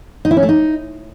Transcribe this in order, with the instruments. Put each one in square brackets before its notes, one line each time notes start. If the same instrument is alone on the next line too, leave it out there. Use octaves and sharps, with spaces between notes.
[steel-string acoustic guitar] D#4
E4
C#4
A3
D#4